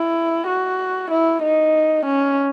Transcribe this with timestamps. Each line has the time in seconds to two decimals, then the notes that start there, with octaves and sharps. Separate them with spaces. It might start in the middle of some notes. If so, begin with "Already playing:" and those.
Already playing: E4
0.47 F#4
1.11 E4
1.42 D#4
2.06 C#4